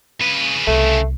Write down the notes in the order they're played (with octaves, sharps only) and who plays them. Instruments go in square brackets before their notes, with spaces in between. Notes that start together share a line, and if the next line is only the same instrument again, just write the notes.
[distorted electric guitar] C#3 B4
[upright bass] C2 [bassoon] A3